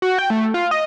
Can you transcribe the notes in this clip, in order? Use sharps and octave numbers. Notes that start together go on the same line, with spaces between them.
F#4
G5
A3
F4
D#5